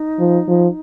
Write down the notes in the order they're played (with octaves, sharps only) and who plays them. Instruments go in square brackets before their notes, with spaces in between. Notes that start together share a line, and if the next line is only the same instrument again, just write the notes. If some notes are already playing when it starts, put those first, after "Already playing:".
Already playing: [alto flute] D#4
[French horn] F3
F3